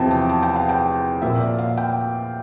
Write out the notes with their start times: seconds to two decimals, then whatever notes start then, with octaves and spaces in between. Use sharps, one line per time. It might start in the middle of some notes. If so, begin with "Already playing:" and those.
Already playing: E2 C3 F3 G5 A5
0.11 A5
0.29 A5
0.43 G5
0.56 F5
0.69 G5
1.22 A#2 F3 A#3 E5
1.40 D5
1.58 F5
1.78 G5